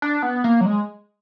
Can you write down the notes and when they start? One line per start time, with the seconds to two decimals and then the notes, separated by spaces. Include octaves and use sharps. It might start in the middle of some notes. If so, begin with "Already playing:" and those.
0.02 D4
0.23 B3
0.44 A#3
0.61 F#3
0.66 G#3